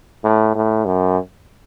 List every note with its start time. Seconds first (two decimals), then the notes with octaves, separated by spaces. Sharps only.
0.24 A2
0.55 A2
0.85 F#2